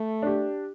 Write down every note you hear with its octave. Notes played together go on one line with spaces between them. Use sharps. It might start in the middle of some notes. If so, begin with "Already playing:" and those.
Already playing: A3
D4 G4